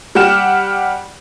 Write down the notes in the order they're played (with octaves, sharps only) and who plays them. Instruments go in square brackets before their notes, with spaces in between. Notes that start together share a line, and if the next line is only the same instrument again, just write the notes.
[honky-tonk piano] G3 G4 F#5 F6 E7